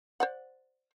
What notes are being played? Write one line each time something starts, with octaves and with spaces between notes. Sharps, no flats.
C5 D5 F#5